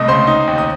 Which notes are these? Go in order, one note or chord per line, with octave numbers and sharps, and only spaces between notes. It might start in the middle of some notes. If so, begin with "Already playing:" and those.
Already playing: C2 A3 D#5 D#6
C#2 C5 C6
D#4
D#2
D#6